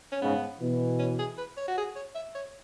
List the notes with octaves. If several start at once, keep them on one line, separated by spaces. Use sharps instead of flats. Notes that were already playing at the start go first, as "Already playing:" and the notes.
C#4
G#2 C#3 B3
B2 E3
C#4
G#4
B4
C#5
F#4
G#4
C#5
E5
C#5